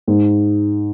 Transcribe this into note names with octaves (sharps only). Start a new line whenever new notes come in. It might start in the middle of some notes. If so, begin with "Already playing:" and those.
G#2